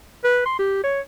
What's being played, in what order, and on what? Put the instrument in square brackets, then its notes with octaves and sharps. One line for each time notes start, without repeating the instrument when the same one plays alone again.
[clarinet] B4
C6
G4
C#5